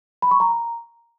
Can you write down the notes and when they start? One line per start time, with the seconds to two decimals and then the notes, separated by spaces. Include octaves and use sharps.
0.22 B5
0.31 C#6
0.40 A#5